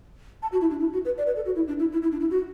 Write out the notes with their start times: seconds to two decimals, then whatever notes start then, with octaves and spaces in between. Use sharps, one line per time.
0.42 A5
0.52 F#4
0.61 E4
0.70 D4
0.80 E4
0.93 F#4
1.05 B4
1.18 D5
1.26 B4
1.36 A4
1.45 F#4
1.55 E4
1.68 D4
1.79 E4
1.92 E4
2.02 E4
2.12 D4
2.20 E4
2.31 F#4